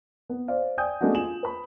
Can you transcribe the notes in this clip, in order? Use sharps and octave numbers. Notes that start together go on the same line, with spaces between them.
B3
C5 D5 F5
D5 G5 G#5 D#6 G6
G#3 A3 B3 C#4 D4 F#4
F4 G#5 E7 F#7
B4 B5